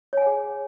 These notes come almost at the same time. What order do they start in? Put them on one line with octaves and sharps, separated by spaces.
C#5 G#5 F#5 G#4